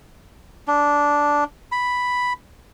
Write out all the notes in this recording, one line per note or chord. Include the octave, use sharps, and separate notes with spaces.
D4
B5